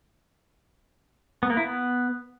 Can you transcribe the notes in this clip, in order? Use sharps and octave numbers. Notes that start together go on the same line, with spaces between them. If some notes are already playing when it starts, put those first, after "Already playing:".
B3
A#3
E4
B3